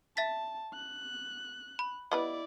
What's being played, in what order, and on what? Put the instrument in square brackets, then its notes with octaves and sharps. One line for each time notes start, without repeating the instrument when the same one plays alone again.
[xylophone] E5 A6 B6 [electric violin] A5
[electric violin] F#6
[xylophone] B5
[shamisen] G3 B3 B4 [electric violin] E4 D5 [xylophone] D#5